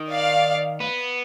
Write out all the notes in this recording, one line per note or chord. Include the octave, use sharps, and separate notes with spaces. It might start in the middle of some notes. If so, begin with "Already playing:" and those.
Already playing: D#3
D5 F5
B3